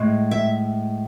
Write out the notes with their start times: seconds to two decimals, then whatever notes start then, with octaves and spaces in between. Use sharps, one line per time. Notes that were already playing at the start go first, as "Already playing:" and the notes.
Already playing: A2 G#3
0.31 E5